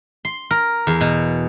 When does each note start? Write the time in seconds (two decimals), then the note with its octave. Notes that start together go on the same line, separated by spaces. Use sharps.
0.25 C6
0.51 A#4
0.87 E2
1.01 B2